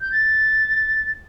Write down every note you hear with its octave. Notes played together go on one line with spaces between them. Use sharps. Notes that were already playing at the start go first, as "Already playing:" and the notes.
G6
A6